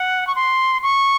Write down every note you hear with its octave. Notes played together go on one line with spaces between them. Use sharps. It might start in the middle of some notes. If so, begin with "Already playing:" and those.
Already playing: F#5
C#6
C6
C#6